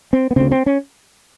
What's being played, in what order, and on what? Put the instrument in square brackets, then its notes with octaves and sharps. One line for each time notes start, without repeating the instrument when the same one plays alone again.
[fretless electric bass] C4
B3
D2 C#3 C4
C4
C#4